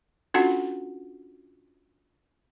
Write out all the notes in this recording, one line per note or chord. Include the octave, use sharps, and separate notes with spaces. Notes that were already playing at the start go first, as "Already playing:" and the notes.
C#4 D4 F4 F#4 A4 F#5